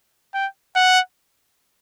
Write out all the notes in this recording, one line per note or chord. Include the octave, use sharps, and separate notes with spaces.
G5
F#5